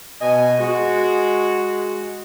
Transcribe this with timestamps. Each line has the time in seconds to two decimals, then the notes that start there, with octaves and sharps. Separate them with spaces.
0.20 B2 D#5 G#5
0.59 G#3 F#4